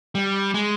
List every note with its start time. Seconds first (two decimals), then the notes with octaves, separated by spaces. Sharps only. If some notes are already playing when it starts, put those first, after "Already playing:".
0.15 G3
0.54 G#3